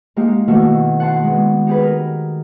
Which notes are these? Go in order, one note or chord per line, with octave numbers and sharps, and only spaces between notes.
G#3 A#3 D#4 G4
B2 D#3 A3 A#3 E4 F#4
F#5 A5 C6
G#3 B3
D#4 G4 G#4 B4
A#4